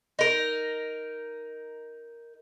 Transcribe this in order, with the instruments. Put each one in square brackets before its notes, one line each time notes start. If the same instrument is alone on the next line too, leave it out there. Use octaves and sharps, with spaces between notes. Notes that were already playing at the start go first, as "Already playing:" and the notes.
[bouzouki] D#4 A#4